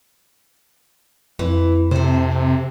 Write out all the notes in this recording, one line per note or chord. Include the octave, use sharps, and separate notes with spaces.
F2 E3
C3 A4 C5